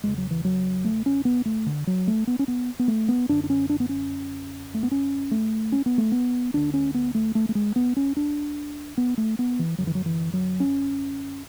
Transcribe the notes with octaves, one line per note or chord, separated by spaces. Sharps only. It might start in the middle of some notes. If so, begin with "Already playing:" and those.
E2 C#3 G#3
F#3
E3
F#3
A3
C#4
B3
A3
D3
F#3
A3
B3
C#4
B3
B3
A3
B3
F#2 D3 D4
D4
C#4
D4
B3
C#4
A3
B3
C#4
A3
C#4
B3
A3
B3
D2 D3 D4
C#4
B3
A3
A3
A3
G#3
B3
C#4
D4
B3
A3
B3
E3
F#2 D3 F#3
E3
F#3
E3
F#3
C#4